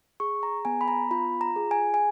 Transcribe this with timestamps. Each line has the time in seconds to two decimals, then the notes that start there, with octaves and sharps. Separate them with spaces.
0.20 G#4 C#6
0.43 A#5
0.65 B3 G#5
0.81 B5
0.88 A#5
1.11 F4 B5
1.41 A#5
1.56 G#4
1.71 G#5
1.94 G#5